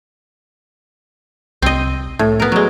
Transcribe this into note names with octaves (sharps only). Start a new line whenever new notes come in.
C2 C4 D#5
A2 A3
B3 A#4
F#3 G#3